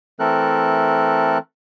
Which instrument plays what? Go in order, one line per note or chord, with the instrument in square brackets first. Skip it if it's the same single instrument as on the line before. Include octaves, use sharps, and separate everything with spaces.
[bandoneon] E3 A3 C4 A4 A#4 F#6